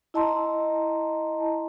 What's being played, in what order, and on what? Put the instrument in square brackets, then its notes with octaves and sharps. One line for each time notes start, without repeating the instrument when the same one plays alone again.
[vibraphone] E4 D#5 A5 A#5 C6